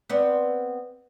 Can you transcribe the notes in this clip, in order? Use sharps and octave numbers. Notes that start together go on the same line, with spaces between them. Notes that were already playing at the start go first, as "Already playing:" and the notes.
B3 C4 D5